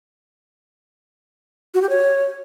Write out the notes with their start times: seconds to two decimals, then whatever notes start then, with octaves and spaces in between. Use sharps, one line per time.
1.74 F#4
1.82 G4
1.90 C#5